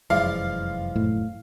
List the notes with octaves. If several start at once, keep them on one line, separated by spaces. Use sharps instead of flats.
F1 F#2 E3 F3 G#3 D5 F5
A2